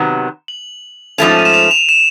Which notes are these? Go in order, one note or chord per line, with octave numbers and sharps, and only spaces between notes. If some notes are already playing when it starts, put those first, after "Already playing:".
Already playing: C3 D#3 F#3 B3
F#7
G#2 F3 A3 C#4 F7
D#7
E7
F7
F7
E7